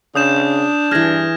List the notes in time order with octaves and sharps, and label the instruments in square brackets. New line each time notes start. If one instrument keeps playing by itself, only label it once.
[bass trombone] C#3 [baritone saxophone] D4 [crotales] D#6 G6 E7
[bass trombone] G2 [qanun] E3 G#4 [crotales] F6 G#6 A#6